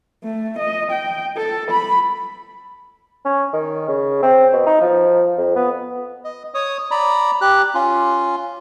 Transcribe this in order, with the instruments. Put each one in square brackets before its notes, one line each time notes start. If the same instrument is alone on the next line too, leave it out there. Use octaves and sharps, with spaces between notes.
[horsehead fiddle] A3
D#5
G5
A4
B5
[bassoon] C#4
D#3
C#3
C4
B2
D#4
F3
F2
B3
[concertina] D#5
C#5 D#6
D5 A#5 B5
G4 F#6
C#4 F4